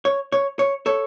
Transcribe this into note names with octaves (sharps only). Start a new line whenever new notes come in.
C#5
C#5
C#5
A4 C#5